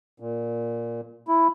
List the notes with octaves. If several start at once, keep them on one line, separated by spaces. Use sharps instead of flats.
A#2
E4